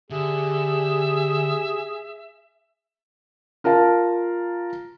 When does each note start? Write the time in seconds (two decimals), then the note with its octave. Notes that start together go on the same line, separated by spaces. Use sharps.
0.10 D3 G4 G#4 E5
3.64 F4 A#4 F5 A5